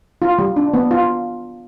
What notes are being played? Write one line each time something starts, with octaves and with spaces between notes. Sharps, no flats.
F4
G3
D4
B3
F4